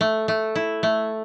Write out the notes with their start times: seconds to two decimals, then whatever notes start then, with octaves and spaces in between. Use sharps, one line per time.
0.01 A3
0.28 A3
0.55 E4
0.83 A3